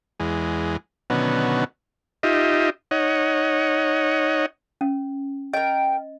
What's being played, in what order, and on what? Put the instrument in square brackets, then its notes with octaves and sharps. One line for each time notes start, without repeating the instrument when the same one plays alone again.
[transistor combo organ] E2 G#3
B2 D3 D#3 F#3 B3 C#4
D#4 F4 G4 D#5 E5
D#4 C#5 D#5 F#5
[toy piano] C#4
[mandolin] A#4 G5 [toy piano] D#5